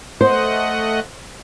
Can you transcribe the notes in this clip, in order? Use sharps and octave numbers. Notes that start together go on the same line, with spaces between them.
A3 C5 D#5 F#5